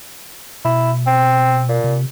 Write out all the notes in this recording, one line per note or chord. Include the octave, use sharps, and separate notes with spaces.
B2 E4
C4
A#2
C3